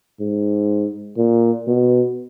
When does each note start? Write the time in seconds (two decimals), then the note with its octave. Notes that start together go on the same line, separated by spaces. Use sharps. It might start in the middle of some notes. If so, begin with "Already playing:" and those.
0.20 G#2
1.17 A#2
1.67 B2